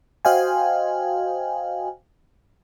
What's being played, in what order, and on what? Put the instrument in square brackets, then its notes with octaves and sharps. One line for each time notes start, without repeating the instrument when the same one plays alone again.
[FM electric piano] F#4 C5 D#5 F5 G5 G#5